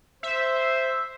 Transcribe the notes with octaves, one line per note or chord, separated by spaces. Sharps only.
C5 E5